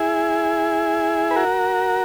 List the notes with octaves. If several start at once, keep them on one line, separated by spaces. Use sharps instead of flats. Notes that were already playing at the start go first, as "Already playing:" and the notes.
Already playing: E4 G#4
B4
F#4 A#4